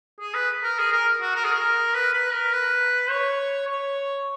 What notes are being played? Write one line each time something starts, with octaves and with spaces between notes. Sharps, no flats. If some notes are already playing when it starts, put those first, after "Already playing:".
G#4
B4
A#4
G#4
A#4
F#4
A#4
G#4
A#4
B4
B4
A#4
B4
C#5
C#5